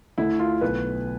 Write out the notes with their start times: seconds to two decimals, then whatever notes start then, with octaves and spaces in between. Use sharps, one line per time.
0.18 D2 D3 A3 E4
0.39 F4
0.61 B1 B2 A3 B4